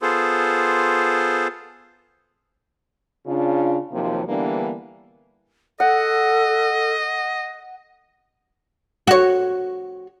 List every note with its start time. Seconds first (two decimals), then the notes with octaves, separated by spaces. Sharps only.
0.02 B3 F4 G#4 A4 C5
3.26 C#3 D4 F4
3.92 D#2 C3 F3 F#3 A#3 D#4
4.28 D3 E3 G3 A#3 B3 D4
5.80 A4 D#5 F#5
9.07 F#4 C#5